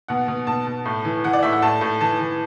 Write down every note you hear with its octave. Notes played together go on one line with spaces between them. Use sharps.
B2 F#5
B2
B2 A5
B2
A2
E3
E3 F#5
D5
A2 E5
F#5
A2 A5
A2
E3 A5
E3